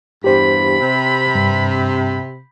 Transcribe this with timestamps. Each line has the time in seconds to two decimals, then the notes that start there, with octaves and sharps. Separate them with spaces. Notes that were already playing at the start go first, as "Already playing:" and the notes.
0.24 E2 G2 G4 C5 B5
0.80 C3
1.35 G2